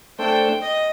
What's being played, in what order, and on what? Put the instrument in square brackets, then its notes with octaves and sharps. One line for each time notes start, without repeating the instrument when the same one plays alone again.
[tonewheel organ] A3 D4 A4 C5 [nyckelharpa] G5
[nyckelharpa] D#5